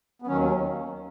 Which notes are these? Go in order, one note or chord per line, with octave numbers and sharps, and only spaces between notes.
B3
D#2 D#3 F#3 C#4